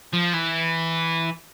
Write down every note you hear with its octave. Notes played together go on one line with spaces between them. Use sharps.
F3
E3